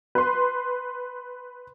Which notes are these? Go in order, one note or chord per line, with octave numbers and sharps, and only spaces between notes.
B4 C6